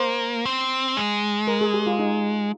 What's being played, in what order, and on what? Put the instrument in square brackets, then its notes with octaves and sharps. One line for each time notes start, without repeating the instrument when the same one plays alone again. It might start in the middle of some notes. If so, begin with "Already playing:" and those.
Already playing: [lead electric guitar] A#3 [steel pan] C5
[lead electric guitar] C4
G#3
[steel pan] A#4
G#4
G4
F4
D#4